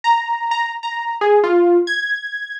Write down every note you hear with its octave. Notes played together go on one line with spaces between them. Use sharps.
A#5
A#5
A#5
G#4
F4
G#6